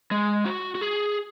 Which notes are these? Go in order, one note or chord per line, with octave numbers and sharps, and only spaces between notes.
G#3
F#4
F#4
G#4